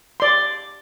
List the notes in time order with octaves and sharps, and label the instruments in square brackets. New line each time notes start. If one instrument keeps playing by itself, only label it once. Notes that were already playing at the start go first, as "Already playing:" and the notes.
[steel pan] D5 C6